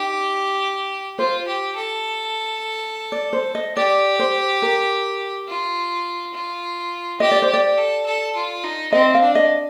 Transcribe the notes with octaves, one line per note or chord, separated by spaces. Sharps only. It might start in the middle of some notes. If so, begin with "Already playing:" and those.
Already playing: D#4 G4
F4 C5
G4
A4
D5
C5
D#5
G4 D5
C5
A#4
F4
F4
G4 D#5
D5
C5
G4 D5
A4
A4
F4
D#4
C4 D#5
F5
D4
D#5